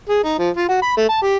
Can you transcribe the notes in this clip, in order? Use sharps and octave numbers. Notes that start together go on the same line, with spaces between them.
G#4
D#4
F3
F4
F#4
B5
A3
A5
G4